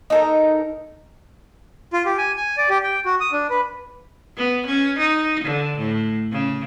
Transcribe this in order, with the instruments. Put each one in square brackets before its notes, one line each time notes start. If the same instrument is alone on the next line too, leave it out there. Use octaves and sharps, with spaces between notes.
[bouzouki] D#4 A4 A#4
[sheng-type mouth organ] F4
G4
G#5
G#5
D5
G4
G5
F#4
D#6
D4
B4
[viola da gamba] B3
C#4
D#4
D3
A2
C#3